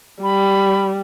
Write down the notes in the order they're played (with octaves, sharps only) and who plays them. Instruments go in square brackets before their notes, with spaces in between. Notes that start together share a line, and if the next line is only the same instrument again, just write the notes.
[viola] G3 [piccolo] B5